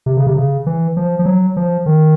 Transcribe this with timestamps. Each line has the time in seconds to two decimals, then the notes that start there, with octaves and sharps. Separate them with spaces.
0.06 C3
0.17 C#3
0.27 C3
0.36 C#3
0.66 E3
0.97 F3
1.19 F3
1.26 F#3
1.57 F3
1.86 D#3